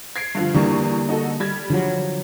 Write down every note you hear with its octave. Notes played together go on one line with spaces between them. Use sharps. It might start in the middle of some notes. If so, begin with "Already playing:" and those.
G#6 C7 D7
G2 D3 F3
E2 D3 E3 G3 A#3 C#6
D#4 F#4 A4
G3 G#6
D3 F3 F#3